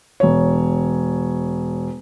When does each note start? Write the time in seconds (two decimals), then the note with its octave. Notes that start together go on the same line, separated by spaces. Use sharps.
0.20 E1 C#5